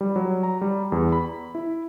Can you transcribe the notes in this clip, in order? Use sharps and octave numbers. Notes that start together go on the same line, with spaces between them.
G3
F#3
A#5
G3
E2
B5
E4